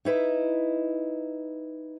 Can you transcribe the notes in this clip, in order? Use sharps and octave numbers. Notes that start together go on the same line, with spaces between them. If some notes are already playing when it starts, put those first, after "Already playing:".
D#4 E4 B4